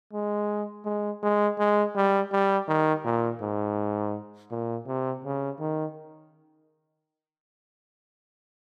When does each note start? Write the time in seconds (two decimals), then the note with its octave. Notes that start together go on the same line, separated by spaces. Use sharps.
0.13 G#3
0.85 G#3
1.23 G#3
1.59 G#3
1.96 G3
2.32 G3
2.68 D#3
3.05 A#2
3.41 G#2
4.51 A#2
4.87 C3
5.25 C#3
5.60 D#3